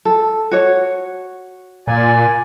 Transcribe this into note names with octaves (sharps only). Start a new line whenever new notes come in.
A4
F#4 C#5
A#2 D5 G#5